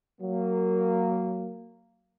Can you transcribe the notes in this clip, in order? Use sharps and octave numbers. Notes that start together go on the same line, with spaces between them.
F#3 A#3